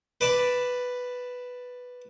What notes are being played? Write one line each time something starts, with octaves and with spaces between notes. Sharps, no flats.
B4 D5 A5 B5